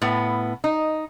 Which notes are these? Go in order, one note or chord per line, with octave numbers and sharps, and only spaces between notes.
A2 B3
D#4